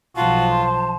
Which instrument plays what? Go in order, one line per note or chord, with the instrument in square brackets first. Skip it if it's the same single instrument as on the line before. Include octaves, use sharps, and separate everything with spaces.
[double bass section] B1 F3 [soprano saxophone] F4 [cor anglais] F#4 [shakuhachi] A5
[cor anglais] C5